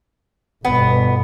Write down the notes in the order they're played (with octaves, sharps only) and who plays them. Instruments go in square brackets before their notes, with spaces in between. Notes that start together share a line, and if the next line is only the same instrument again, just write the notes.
[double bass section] G1 B2 [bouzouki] B3